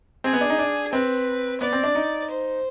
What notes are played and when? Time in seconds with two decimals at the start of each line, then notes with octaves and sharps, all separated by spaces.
0.24 C4 G#4
0.33 B3
0.41 D4
0.50 D#4
0.59 D4
0.93 C4 B4
1.61 B3 D5
1.73 C4
1.83 D4
1.95 D#4
2.30 C5